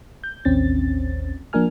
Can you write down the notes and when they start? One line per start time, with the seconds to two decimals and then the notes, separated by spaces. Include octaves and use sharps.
0.24 G6
0.45 A1 D#2 C4 C#4 A6
1.53 F3 A#3 D4 A#4 G#5 F6